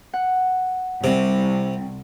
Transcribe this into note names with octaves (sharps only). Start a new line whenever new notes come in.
F#5
C2 C3 C4